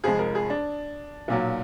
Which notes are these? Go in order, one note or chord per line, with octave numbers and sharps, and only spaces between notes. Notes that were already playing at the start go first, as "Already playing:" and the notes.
F1 F2 F3 G#3 G#4
A#4
G#4
D4
B1 A#2 F#3